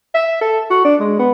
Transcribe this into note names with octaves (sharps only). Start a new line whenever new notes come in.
E5
A4
F#4
D4
G#3
B3